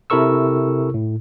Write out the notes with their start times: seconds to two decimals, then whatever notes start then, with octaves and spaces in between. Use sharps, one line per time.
0.10 C3 E4 A4 A#4 C#6 E6
0.94 A2